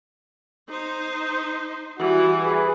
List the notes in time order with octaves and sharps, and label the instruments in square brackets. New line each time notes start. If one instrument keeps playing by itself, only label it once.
[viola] D#4 C5
[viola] E3 G3 [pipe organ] F#4
[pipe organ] G#4 B4